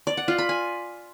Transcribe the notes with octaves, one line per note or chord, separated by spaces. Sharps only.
D5
F#5
F4
B5
G#5